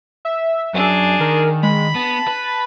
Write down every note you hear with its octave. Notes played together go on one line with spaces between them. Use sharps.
E5
F#2 D4 G#4
D#3 A#4
G#3 B5
B3 A5
B4